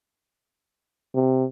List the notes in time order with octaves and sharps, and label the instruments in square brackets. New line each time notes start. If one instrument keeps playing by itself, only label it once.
[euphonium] C3